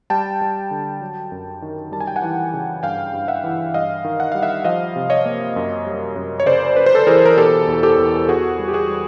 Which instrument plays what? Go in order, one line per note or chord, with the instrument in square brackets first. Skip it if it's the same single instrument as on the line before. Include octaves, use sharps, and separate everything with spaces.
[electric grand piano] G3 G5 A5
G3
D3
F#3
F#2
D#3
G3 A5
G#5
G5
F#5 G#5
E3
C#3
G2 F5 G5
G2
E5 F#5
E3
G2 D#5 F5
D#3
F#5
G3 F5
E5 F#5
F3 D#5 F5
C3
C#5 D#5
A#3
F#2
G3
F#2
C#5
C#3 C5 D5
C#3 B4
C5
A4 B4
E3 G#4 A#4
A#4
B2 G4 A4
E2
G4 A4
E2
B3 F#4 G#4
G3
G4
F#4 G#4
G3